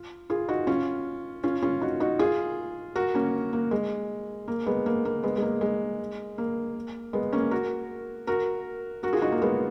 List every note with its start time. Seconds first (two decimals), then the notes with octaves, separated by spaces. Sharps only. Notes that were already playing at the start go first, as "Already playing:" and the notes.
Already playing: F4
0.30 F4 G#4
0.48 D#4 F#4
0.67 C#4 F4
1.44 C#4 F4
1.62 C#4 F4
1.81 D#4 F#4
2.00 D#4 F#4
2.19 F4 G#4
2.95 F#4 A#4
3.14 A#3 C#4
3.53 A#3
3.71 G#3
4.48 A#3
4.66 G#3 B3
4.86 A#3
5.05 A#3
5.23 G#3 B3
5.36 G#3
5.42 A#3
5.61 G#3
6.38 A#3
7.13 G#3 B3
7.33 A#3 C#4
7.51 F#4 A#4
8.27 F#4 A#4
9.03 F#4 A#4
9.13 F4 G#4
9.22 D#4 F#4
9.32 A#3
9.42 G#3 B3